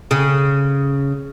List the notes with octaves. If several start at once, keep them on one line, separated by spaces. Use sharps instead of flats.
C#3